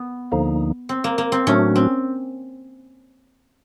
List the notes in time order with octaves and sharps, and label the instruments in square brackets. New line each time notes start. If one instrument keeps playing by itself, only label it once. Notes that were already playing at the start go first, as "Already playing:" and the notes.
Already playing: [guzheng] B3
[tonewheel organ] D2 D3 F3 A#3 D#4
[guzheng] C4
A#3
A#3
C4
[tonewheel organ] A2 F#3 A3 D4 F#4 [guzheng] C#4
[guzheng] C4